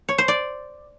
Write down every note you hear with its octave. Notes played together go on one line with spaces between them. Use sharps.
C#5
C5
D5